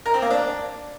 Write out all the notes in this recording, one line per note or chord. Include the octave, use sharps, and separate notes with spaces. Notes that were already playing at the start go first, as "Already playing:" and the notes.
A#4
C4
A#3
D4